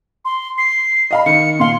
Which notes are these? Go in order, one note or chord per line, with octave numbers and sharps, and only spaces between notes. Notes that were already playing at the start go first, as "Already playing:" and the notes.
C6
C7
D#5 F5 B5
D#3 C#7
A#2 F5 C6